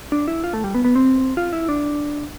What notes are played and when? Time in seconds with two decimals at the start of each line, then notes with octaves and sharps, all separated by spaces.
0.12 D4
0.28 E4
0.44 F4
0.54 A3
0.64 G3
0.75 B3
0.85 B3
0.95 C4
1.37 F4
1.53 E4
1.69 D4